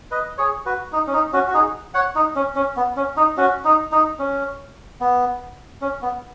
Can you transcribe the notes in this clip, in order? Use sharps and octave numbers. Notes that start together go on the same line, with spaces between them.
B4 D#5
G#4 C#5
F#4 B4
D#4
C#4
D#4
C#4 F#4
F#4
D#4 G#4
C#5 F#5
D#4
C#4
C#4
B3
C#4
D#4
C#4 F#4
D#4
D#4
C#4
B3
C#4
B3